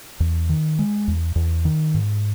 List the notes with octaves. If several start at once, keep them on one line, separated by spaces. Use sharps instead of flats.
E2
D#3
G#3
E2
E2
D#3
G#2